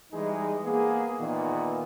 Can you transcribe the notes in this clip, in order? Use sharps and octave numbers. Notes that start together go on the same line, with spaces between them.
E3 G3 G#3 D#4 G#4
A#3 B3 G#4
A#2 D#3 E3 B3